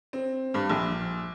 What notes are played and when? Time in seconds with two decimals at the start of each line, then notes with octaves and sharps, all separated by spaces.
0.13 C4
0.54 G2
0.70 A#1